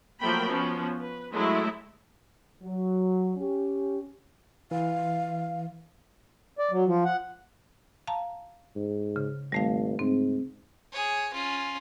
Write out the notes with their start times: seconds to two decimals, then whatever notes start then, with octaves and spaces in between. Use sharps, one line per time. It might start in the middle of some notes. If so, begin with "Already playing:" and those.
0.19 F3 F#3 A3 A#3 G5 B5
0.49 F3 B3 C#4
1.02 B4
1.33 F#3 G#3 A3 E4
2.61 F#3
3.37 C#4 G4
4.71 E3 F5
6.59 D5
6.71 F#3
6.87 F3
7.05 F#5
8.07 F5 A5 A#5
8.76 G#2
9.16 C#3
9.52 G#1 G3 A3 F5
9.99 G#2 C4
10.92 G#4 C#5
11.33 C#4 F4